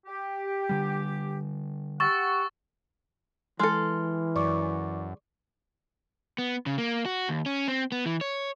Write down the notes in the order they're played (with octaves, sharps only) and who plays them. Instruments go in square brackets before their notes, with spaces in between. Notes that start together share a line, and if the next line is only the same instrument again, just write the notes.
[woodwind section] G4
[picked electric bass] D3 G3
[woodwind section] G4 F#5 [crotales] C#6 E6 A6
[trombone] E3 [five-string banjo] G#3 A4 [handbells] C6 F6
[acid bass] F#2 [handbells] D5 C#6 D6
[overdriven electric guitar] B3
C#3
A#3
F#4
D#2
C#4
C4
B3
E3
C#5